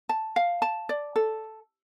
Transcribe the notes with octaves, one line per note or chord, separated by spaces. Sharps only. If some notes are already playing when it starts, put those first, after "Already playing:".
A5
F5
A5
D5
A4